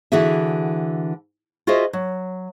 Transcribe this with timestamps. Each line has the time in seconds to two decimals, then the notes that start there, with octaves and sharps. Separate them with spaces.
0.12 D3 E3 E4 F#4 G#4 E5
1.67 F4 F#4 G#4 C5 D#5 E5
1.93 F#3